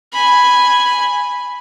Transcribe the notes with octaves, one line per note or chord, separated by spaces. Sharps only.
G#5 B5